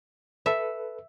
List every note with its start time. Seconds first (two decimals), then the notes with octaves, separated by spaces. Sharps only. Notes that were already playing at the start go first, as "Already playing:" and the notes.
0.46 A4 B4 E5